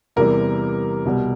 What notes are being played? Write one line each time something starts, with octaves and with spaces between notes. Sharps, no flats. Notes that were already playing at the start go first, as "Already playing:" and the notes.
E2 C3 E3 G3 A#4
C2 B2 G3